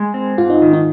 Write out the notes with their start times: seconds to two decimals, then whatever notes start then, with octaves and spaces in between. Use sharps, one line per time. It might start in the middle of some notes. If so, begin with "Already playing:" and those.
Already playing: G#3
0.14 C4
0.38 G#2 F4
0.50 D#4
0.62 D#3
0.73 D#4